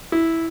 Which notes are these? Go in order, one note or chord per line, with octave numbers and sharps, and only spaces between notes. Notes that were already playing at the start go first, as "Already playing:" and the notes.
E4